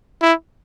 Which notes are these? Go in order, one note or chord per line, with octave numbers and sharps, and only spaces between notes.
E4